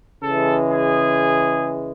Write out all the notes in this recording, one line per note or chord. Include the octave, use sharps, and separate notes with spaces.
C#3 E3 G#3 A4
G#4